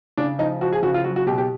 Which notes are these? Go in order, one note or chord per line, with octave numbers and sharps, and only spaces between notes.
C#3 D4
F3 D#4
F3 F#4
G#4
C#3 F#4
F4
F#3 F#4
F#4
B2 G4
G4